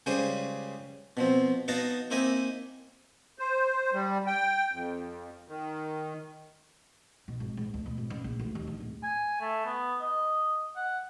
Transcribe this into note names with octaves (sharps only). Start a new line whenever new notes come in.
C#2 C#3 G3 G#4 C5 G#5
B2 F3 C4
B3 D#4 F#4 F5 A5 A#5
A#3 C4 D#4 E4 D#5 G#5
C5
G3
G5
F2
D#3
B2
G#1
G#2
D2
B2
G#1
C#3
A#1
D2
D#2
D3
D1
G#5
A3
B3
D#5
F#5